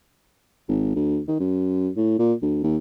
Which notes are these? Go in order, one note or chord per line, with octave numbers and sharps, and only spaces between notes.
G#1
D2
D#3
F#2
A2
A#2
D2
D#2